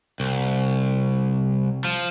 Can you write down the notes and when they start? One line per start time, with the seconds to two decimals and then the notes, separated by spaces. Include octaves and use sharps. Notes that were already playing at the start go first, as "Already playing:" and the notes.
0.20 C2
1.85 F3